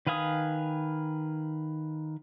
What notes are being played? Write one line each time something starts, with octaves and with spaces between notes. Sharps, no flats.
D#3 B4 F5 G#5 D#6